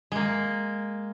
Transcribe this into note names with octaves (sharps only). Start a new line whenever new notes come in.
G#3 A#3